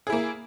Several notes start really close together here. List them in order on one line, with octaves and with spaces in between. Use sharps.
G#4 E4 A#3